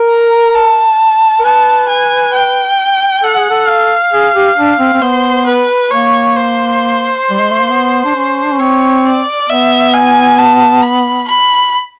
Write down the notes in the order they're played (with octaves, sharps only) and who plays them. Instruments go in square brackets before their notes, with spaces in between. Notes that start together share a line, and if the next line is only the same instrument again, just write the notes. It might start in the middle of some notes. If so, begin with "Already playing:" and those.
Already playing: [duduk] A#4
[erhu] A#5
A5
[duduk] A#4
[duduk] B4 [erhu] A5
[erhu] G#5
G5
[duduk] A4 [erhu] F#5
[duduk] G#4
A4
[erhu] F5
[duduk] G#4
G4
D4
C4
C4
[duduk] B3 [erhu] C5
[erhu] B4
[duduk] A#3 [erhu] C#5
[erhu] C5
[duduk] G3
G#3
A3
A#3
B3
D4
C#4
D4
C#4
[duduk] C4 [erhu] C#5
[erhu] D5
[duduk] B3 [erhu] E5
[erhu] G#5
A5
B5
B5